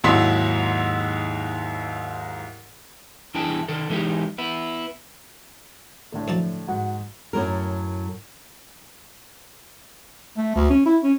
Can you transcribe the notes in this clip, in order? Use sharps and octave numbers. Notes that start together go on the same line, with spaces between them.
D#2 G#2 F#3 E4 C6 B6
E2 D4 E4 G#4 G5 A5
D#3 A4
E3 G#3 D#4 G4
B3 E4
A2 D3 A3
F#2 F3 A5
G#2 F#4
F#2 A2 F#3 A#4
A3
D2
C#4
E4
C#4